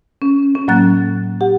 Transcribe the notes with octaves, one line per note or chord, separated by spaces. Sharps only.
C#4
C#4
A2 F#3 A#3 F#6 A6
G4 F#5